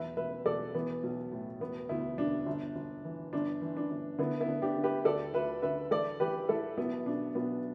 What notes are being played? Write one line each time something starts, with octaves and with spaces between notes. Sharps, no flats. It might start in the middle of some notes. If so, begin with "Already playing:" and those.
Already playing: B1 E2 B4 E5
E1 B4 E5
E1 A4 D5
E3 B3
B1
A2
E1 B3
D2 B3 E4
E1 D4
G1
G1
E3
G1 D4
E3
D4
G1
D3 B3 E4
B3 E4
D3
D4 G4
D3
G4 B4
D2 A4 D5
D2 B4 E5
D3 B4 E5
A1 A4 D5
E3 G4 B4
A1 E4 A4
B1 B3 E4
B2 D4
B1 B3